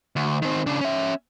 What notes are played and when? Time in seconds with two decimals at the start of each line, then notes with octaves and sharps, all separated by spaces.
0.16 D2
0.42 D#3 C4
0.66 C#3 D4
0.81 C#4 E5